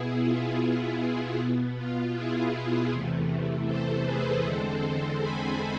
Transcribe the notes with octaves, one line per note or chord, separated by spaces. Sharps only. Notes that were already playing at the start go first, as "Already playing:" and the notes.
Already playing: B2 B3 E4 G#4
F4
F4
E4
B2 B3
F4
E4 G#4
E2 C3 E3 A3
A4 C5
G#4 B4
E2 D3 G#3 C4 A4 C5
A4 C5
G#5 B5